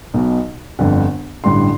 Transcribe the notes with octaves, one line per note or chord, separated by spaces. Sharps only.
B1 B2
G1 F2 D3
A1 G2 D3 C6